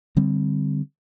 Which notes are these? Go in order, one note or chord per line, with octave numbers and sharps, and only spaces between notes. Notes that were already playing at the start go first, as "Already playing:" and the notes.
D3 G3 C4